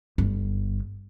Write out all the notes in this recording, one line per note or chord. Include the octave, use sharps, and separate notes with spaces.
G1